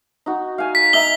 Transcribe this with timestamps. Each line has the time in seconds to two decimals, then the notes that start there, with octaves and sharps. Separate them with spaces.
0.26 D#4 F#4
0.58 F5 G#5
0.75 B6
0.93 D#5 E5 A#5 G7